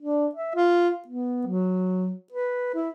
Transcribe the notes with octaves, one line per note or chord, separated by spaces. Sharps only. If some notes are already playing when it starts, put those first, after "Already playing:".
D4
E5
F4
B3
F#3
B4
E4